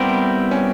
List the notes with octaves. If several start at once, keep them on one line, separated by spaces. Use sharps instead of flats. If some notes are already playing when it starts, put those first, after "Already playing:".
Already playing: G3 B3 C4 E4 G4 A#4
C#4